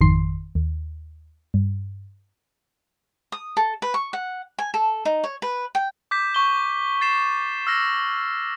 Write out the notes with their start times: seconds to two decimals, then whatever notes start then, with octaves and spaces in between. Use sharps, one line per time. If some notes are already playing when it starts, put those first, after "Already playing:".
0.01 G#1 F2 D#3 C6 C7
0.55 D#2
1.54 G2
3.32 D#6
3.57 A4
3.82 B4
3.94 C#6
4.13 F#5
4.59 G#5
4.74 A4
5.05 D#4
5.24 C#5
5.42 B4
5.75 G5
6.11 D6 G6 B6
6.35 C#6 G7
7.01 A6 C7 E7
7.67 E6 F6 A#6